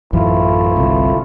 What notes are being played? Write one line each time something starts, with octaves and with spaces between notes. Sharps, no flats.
A1 F#2 E3 A3 E4 F4
G1 C2 C3